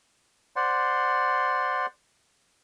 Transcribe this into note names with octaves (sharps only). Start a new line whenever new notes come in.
C5 D5 F#5 C6